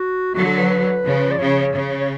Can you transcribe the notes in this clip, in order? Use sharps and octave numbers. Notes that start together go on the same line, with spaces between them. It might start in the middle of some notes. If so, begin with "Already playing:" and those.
Already playing: F#4
D3 F#3 F#4
A4
B4
B4
C#3 F3
D5
C#3 C#5
C#3
C#5